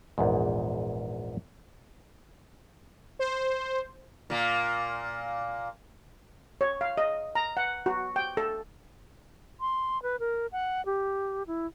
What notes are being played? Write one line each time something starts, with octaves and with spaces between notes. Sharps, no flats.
A#1 E2 G#2
C5
A#2 A#3
C#5
F5
D#5
A#5
F#5
F#4
G5
A4
C6
B4
A#4
F#5
G4
E4